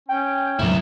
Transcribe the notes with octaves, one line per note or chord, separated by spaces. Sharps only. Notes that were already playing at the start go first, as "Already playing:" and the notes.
C#4 G5
D2 G#2 C3 F#3 E4